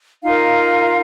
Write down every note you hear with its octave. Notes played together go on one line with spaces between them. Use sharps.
D#4 F4 A#4 F5